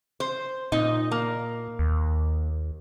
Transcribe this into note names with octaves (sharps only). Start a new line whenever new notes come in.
C5
A#2 D#4
A#3
D#2